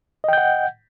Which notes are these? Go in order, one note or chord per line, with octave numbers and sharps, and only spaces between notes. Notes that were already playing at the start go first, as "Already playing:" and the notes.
D#5 F#5 G5 G6